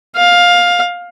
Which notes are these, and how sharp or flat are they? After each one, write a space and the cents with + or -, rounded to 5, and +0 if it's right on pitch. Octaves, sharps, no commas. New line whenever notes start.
F5 +15